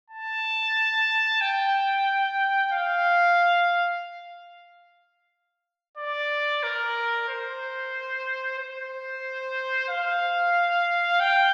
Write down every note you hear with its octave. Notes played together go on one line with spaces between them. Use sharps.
A5
G5
F5
D5
A#4
C5
C5
F5
G5